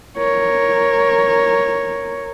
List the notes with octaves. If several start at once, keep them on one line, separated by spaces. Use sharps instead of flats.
A#4 C#5